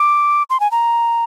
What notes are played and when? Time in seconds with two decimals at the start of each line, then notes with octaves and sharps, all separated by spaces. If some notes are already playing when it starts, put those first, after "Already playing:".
Already playing: D6
0.50 C6
0.60 G#5
0.71 A#5